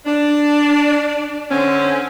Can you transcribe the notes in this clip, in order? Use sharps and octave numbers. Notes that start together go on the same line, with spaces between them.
D4
D3 C4 C#4